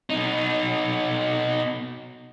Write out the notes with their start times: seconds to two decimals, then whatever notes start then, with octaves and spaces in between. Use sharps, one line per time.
0.10 B2 D#4